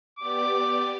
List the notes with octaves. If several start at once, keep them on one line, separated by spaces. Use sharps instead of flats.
B3 G4 D5 D6